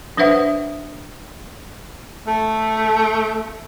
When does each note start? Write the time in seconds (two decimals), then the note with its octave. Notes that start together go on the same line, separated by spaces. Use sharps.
0.17 F#3 D4 B4 C5 E5 F#5
2.27 A3